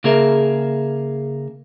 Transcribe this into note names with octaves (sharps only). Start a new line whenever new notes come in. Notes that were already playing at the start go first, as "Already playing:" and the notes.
C#3 A#3 G#4 A#4 E5